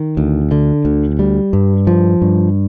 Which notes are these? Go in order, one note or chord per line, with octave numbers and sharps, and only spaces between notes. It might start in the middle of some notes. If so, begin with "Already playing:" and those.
Already playing: D#3
D2
D3
D2
G3
G2
F3
G2